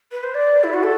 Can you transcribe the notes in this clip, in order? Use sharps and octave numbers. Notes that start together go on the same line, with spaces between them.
B4
C5
D5
E4
F#4
A4